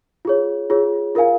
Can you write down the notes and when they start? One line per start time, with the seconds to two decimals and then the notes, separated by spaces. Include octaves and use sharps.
0.25 F4 G#4 C#5
0.70 F4 G#4 C#5
1.15 F4 A#4 F5 G#5